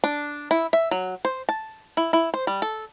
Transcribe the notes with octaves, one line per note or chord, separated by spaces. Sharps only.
D4
E4
E5
F#3
C5
A5
E4
E4
C5
G3
A4